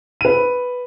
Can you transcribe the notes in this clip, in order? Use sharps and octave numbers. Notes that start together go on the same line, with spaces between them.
B4 D#7